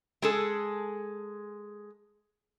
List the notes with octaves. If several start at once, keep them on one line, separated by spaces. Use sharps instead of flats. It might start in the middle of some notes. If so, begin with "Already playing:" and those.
G#3 G#4 A4